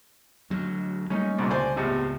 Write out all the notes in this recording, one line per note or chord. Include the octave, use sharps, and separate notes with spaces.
D2 F#3
G3 A3 A#3 C#4 D#4
C2 A#2 D3
C#2 C5 D5 G#5
E2 A2 C3